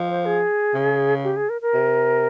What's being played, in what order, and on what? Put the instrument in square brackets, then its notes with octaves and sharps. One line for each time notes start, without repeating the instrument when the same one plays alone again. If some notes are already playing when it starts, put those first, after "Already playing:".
Already playing: [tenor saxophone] F3
[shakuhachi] C5
G#4
[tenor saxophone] C#3
[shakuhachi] G4
G#4
A#4
A#4
[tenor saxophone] C3